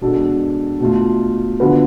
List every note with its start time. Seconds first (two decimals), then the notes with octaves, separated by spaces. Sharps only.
0.01 B2 G#3 D4 F#4 A4
0.80 B2 A3 F4
1.60 D3 F3 B3 F#4 B4